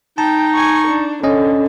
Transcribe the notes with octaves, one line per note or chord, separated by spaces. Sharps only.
D#4 G5 A5
G#5 C#6
D4
D3 C#4 D#5